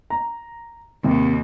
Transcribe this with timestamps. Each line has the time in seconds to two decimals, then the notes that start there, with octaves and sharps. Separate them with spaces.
0.10 A#5
1.04 D#2 C3